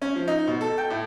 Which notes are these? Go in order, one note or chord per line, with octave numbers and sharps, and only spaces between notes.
C#4
F3
D#4
B2
A4
G5
A2